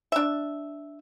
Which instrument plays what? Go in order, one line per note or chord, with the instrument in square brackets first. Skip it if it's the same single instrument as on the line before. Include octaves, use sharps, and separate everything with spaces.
[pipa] D4 E5